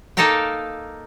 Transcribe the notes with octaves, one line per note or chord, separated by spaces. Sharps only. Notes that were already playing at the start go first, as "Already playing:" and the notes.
A#3 D#4 A4 A#4 F5 G5